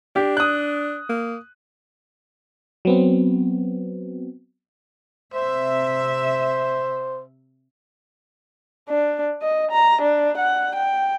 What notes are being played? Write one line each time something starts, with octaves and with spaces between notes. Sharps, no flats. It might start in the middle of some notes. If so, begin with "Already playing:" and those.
D4 G4
D#6 F#6
A#3
F#3 B3 C4
C3 C5 E5
D4
D#5
A#5
D4
F#5
G5